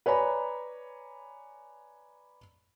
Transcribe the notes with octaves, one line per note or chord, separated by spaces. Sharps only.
B4 C#5 D5 G#5 A#5 B5